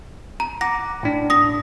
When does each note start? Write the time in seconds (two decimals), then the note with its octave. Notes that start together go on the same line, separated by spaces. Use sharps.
0.40 A#5
0.61 F#5 D6 A#6
1.03 A2 D4
1.30 D#6 A#6